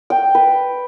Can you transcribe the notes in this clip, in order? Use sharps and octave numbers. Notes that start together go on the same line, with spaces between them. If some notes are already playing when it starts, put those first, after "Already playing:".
G5
B4